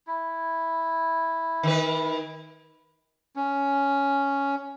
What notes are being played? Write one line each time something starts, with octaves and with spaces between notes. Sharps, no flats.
E4
D#3 B4
C#4